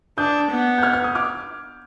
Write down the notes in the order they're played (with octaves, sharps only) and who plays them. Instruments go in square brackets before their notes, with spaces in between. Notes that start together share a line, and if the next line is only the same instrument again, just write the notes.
[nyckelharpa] D4 [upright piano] D#6 G6
[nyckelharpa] B3
[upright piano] G6
F6 G#6
F6 G#6
D#6 G6
D6 F6